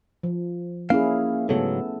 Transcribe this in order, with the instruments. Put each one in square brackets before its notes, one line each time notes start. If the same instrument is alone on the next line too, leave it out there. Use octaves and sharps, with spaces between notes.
[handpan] F3
[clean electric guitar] A#3 F5 [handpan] C#4 E4 G#4
[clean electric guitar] G#2 C#3 F#3 [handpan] A3 B3 A4